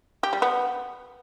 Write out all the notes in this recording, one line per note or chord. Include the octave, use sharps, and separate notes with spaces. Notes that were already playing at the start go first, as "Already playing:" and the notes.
G4
G3
B3